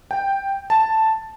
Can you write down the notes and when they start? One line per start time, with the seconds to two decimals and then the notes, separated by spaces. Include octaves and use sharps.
0.11 G5
0.70 A5